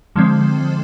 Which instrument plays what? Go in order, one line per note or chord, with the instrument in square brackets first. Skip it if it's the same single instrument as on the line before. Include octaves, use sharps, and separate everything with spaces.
[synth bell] D3 F3 G#3 C4